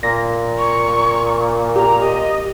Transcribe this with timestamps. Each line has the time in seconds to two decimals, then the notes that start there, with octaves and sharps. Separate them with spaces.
0.03 A#2 A#6
0.58 C#6
1.76 G4 A#5
2.00 D#5